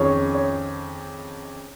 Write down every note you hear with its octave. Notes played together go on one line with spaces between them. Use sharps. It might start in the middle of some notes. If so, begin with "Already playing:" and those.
Already playing: F2 D#3 C#4 G#4 C#5
C#5